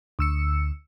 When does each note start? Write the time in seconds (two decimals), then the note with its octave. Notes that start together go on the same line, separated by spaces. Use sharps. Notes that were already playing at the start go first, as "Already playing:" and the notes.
0.19 D2 E6 C#7